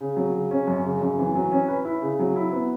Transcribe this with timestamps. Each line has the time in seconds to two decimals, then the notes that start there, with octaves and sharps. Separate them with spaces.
0.01 C#3
0.17 F#3
0.34 C#3
0.51 C#4
0.67 F#2
0.85 C#3
1.01 F#2
1.19 E3
1.35 F#3
1.52 C#4
1.68 B4
1.85 E4
2.02 C#3
2.19 F#3
2.36 E4
2.52 B3